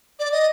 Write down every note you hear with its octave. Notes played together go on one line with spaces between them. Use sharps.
D5
D#5